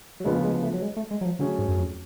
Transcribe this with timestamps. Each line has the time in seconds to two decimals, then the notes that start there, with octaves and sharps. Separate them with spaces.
0.20 F#3
0.24 D2 C#3 F3 G#3 B3
0.44 G#3
0.63 A3
0.74 F#3
0.82 G#3
0.96 A3
1.11 G#3
1.21 F#3
1.25 F3
1.39 D3 F#3 A3 C#4 G#4
1.59 G#2
1.68 F#2
1.78 F2